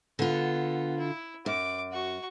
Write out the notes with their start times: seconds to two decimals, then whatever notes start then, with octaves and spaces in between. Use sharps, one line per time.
0.19 D3 B3 F4
0.99 E4
1.46 F#2 D6
1.91 F#4 C#6